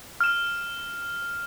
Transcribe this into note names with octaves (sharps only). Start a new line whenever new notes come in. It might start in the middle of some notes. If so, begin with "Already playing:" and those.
F6 E7